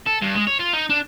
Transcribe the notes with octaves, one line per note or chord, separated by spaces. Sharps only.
A4
G2
G#3
C#5
F4
D#4
D4